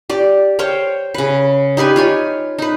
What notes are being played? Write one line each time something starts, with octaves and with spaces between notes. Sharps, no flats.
G4 D5
C5 C#5 F5 G5
C#3 B4
D#4 G4 B4 G#5
F4 C#5 G#5
D#4 B4